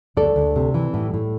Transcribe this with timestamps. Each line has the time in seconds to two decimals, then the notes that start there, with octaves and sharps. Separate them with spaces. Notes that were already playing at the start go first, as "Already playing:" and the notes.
0.17 D2 A4 D5
0.36 D2
0.56 C3
0.74 E3
0.94 A2
1.14 A2